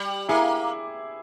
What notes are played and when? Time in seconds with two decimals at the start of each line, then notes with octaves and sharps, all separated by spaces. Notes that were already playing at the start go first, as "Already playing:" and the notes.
Already playing: G3 G5
0.29 A#3 E4 G#4